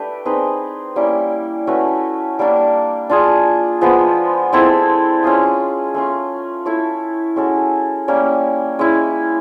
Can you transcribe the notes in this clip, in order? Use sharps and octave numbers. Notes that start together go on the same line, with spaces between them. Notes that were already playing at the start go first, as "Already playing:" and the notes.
Already playing: A3 D4 G4 B4
C4 D#4 G#4 B4
G3 A#3 C#4 E4
A3 C#4 F#4 B4
G3 A#3 D4
D4 F4 G#4
F3 G#3 B3
G#3 C4 E4 A4
G#3 C#4 F4 G#4
A3 C#4 F4
E4 A4 C#5
G#3 C#4 F#4 A4
G3 A#3 C#4
G#3 C#4 E4